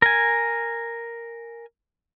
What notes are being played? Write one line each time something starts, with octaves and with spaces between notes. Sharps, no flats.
A#4 G#5